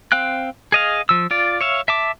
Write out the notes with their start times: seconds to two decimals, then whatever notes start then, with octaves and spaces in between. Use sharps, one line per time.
0.12 C4 F5 G5 F#6
0.72 G#4 D#5 F5
1.09 F3 E6
1.31 F4 D5
1.61 C#5 E5 F5
1.88 E5 A5 D6